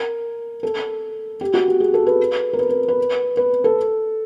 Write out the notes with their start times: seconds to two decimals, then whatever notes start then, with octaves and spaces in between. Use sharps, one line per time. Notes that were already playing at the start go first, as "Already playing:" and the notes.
Already playing: A#4
0.63 A4
1.41 G4
1.54 F#4
1.68 G4
1.80 G#4
1.94 A4
2.07 B4
2.53 A#4
2.59 B4
2.69 B4
2.88 B4
3.37 B4
3.64 A4